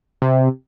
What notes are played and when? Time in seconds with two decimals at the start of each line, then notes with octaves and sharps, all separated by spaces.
0.22 C3